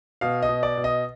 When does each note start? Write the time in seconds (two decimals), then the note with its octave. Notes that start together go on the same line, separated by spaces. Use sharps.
0.21 B2 F5
0.42 D#5
0.49 B2
0.63 D5
0.77 B2
0.84 D#5